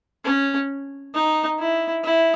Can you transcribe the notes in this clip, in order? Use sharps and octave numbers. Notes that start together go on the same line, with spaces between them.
C#4
D#4
E4
E4